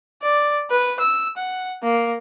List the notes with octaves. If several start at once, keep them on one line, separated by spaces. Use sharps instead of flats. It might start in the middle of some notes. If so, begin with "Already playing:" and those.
D5
B4
E6
F#5
A#3